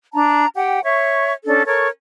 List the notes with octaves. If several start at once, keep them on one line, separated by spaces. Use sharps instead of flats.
D4 A5 A#5
G4 F#5 G5
C#5 E5 C#6
C#4 D4 A4
A4 A#4 C#5 C#6